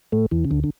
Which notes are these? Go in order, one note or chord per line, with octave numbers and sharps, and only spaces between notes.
A2 A3
E2 E3
C#3
D2 D3
D3